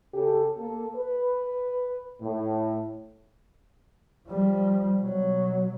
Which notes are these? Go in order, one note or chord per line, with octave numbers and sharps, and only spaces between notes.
C#3 G4 A4
A#3 A4
B4
A2
F3 G3
B2 F#3